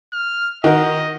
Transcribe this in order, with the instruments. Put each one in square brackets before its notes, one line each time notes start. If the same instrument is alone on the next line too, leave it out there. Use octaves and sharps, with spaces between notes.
[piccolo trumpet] F6
[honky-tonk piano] D#3 [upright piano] F#4 A#4 [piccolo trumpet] D#5